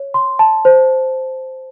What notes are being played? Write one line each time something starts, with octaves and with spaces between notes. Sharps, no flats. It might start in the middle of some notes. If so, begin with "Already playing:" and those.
Already playing: C#5
C6
A5
C5